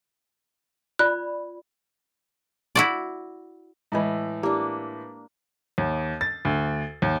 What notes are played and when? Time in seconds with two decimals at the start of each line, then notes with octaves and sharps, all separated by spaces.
0.99 F4 D5 B5 F#6
2.75 E4 F#4 D5
3.92 A2 E3 G#3 D#5 B5
4.43 A#3 D4 E4 G4
5.78 D#2
6.21 A6
6.45 D2
7.02 D#2